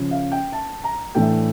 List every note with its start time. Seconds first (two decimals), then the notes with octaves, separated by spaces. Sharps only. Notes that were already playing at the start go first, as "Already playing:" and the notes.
Already playing: C#3 F3 C#4
0.11 F5
0.32 G5
0.52 A5
0.84 A#5
1.15 A2 E3 A3 D4 G5